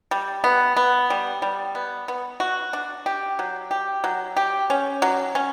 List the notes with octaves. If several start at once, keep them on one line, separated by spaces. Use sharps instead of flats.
G3
B3
B3
G3
G3
B3
B3
F#4
D4
G4
F#3
G4
F#3
G4
C#4
F#3
C#4